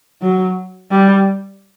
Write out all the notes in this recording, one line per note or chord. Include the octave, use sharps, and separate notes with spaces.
F#3
G3